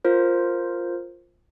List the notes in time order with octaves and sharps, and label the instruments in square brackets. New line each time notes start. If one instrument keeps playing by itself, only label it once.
[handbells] F4 A#4 C5